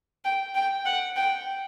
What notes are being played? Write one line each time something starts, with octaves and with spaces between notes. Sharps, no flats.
G5
G5
F#5
G5